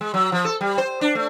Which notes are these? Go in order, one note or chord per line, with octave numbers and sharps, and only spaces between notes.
G#3
F#3
F3
A4
G3
C5
D4
A3